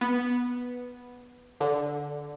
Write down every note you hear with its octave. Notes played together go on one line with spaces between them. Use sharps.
B3
D3